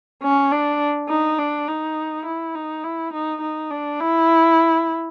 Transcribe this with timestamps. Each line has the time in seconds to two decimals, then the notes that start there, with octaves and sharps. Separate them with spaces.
0.23 C#4
0.52 D4
1.09 D#4
1.39 D4
1.68 D#4
2.26 E4
2.55 D#4
2.84 E4
3.13 D#4
3.42 D#4
3.71 D4
4.00 E4